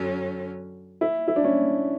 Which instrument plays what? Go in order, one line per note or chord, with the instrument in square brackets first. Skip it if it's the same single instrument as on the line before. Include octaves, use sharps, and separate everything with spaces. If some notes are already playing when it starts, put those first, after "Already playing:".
Already playing: [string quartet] F#2 D3 F#3 C#4
[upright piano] E4
E4
D4
C#4